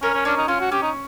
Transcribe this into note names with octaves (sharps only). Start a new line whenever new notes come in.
C#4 A#4
C#4
C#4 D4
D#4
C#4 F4
F#4
C#4 G4
D#4